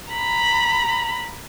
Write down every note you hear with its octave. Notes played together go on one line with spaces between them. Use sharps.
A#5 B5